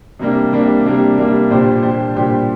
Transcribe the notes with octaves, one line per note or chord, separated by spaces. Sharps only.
C3 G3 A#3 D4
C3 G3 A#3 D4
C3 G3 A#3 D4
C3 G3 A#3 D4
A#2 G3 D4 G4 C5
A#2 G3 D4 G4 C5
A#2 G3 D4 G4 C5